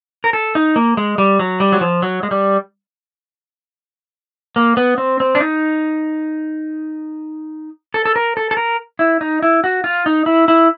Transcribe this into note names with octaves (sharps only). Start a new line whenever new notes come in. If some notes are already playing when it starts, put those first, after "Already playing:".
A#4
A4
D#4
A#3
G#3
G3
F#3
G3
F#3
F3
F#3
G#3
G3
A#3
B3
C4
C4
D4
D#4
A4
A4
A#4
A4
A4
A#4
E4
D#4
E4
F#4
F4
D#4
E4
E4